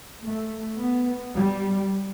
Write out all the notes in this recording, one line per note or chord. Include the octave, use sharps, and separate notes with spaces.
A3
B3
G3